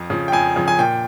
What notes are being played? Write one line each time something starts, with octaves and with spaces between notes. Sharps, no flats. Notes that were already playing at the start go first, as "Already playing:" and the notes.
Already playing: F2
C#3 F3
G5
F2 G#5
C#3 F3
G#5
A#2 G5